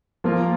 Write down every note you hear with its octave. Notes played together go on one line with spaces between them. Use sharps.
F3 A#3 F4 A#4